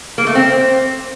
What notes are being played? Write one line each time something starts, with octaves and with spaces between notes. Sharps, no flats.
A#3
A3
C4